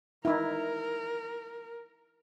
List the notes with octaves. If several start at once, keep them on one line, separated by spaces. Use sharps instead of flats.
D#4 E4 A#4